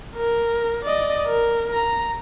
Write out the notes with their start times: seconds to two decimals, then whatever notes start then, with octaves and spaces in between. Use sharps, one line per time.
0.16 A#4
0.85 D5 D#5
1.27 A#4
1.74 A#5